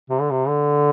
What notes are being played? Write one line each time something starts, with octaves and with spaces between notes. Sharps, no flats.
C3
D3
C3
D3